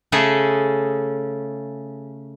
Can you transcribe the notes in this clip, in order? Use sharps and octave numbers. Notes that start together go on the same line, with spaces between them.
C#3 A3 C#4 G#4 A4